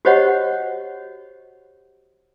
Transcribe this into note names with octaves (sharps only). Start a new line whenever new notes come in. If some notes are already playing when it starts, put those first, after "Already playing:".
F#4 G4 C5 C#5 D#5 F#5